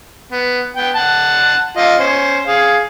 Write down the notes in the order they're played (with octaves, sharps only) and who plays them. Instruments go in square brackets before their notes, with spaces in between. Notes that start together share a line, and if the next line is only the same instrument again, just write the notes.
[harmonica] B3
B3 G5
F#5 A5
F4 D#5
C#4 C5
G#4 F5